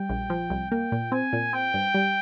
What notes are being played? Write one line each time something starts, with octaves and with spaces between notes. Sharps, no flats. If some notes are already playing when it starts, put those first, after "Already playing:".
Already playing: G3 G5
A#1
F3
C2
A#3 G5
A#2
C4 G#5
A#2
C4 G5
G2
G3